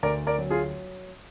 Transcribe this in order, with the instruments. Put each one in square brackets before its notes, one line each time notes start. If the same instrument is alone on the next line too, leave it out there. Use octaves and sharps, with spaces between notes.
[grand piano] D2 A#4 D5
A#4 D5
F#3
F4 G#4